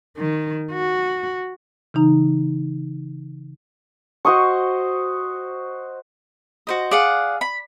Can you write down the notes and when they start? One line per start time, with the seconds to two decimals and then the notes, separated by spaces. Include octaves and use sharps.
0.17 D#3
0.72 F#4
1.94 C#3 E3 D#4 A#5
4.25 F#4 C5 D#5 C#6
6.67 F#4 C5 D#5
6.91 G#4 D5 F5 F#5
7.41 B5